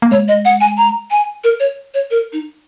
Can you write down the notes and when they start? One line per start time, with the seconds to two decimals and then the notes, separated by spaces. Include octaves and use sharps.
0.02 A#3
0.11 G#3 C#5
0.28 D#5
0.45 F#5
0.61 G#5
0.77 A#5
1.11 G#5
1.44 A#4
1.60 C#5
1.94 C#5
2.11 A#4
2.33 D#4